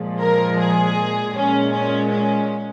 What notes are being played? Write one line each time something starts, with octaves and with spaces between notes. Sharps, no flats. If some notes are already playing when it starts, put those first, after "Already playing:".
Already playing: A#2 F3 G#3
A#4
G#4
A#2 G#3 C#4
C#4
C#4